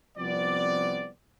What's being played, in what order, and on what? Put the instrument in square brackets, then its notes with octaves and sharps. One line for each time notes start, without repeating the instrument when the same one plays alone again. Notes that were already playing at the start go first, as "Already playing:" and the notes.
[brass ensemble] C2 F3 B3 C4 D5